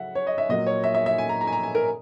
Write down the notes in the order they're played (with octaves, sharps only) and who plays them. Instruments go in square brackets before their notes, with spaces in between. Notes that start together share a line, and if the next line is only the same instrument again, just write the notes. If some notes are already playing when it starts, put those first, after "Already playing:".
Already playing: [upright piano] C#3 F#3 E5 F#5
C#5
D#5
E5
A#2 F#3 A#3 D#5
C#5
E5
E5
E5
G#5
A#5
A#5
G#5
A#5
G#5
A#4